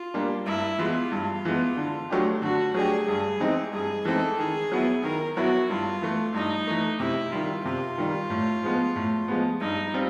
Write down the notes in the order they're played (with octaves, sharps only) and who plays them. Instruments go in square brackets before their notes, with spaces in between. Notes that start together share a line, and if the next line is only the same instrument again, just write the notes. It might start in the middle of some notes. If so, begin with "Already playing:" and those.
Already playing: [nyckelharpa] F4
[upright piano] G3 A#3 D4
[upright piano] G2 [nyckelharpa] E4
[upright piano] E3 G#3 B3 [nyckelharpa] F4
[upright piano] G2
E3 G#3 B3
D3
F#3 A3 D4 G4
[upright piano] D3 [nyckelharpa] F#4
[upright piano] F#3 A3 D4 G4 [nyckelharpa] G#4
[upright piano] G2 [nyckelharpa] G#4
[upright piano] E3 G#3 C4 D#4
[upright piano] G2 [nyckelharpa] G#4
[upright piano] E3 G#3 C4 D#4 [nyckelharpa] A4
[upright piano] D#3 [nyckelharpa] G#4
[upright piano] F#3 B3 E4
[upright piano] D#3 [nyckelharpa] A#4
[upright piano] F#3 B3 E4 [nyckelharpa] F#4
[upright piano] G2 [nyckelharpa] F4
[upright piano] E3 A3
[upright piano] G2 [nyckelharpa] D#4
[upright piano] E3 A3
[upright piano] C3 [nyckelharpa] E4
[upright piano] D#3 G3 [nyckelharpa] F4
[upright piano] C3 [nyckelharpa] F4
[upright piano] D#3 G3
A2
F3 G#3 B3
A2
F3 G#3 B3
[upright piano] G2 [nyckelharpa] D#4
[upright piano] G3 C4 F4